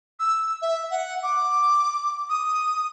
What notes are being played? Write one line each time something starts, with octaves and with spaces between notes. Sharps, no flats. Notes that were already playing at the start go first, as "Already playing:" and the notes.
E6
E5
F#5
D6
D#6